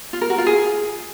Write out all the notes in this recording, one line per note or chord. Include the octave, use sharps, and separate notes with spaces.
F4
A#4
F#4
F4
G#4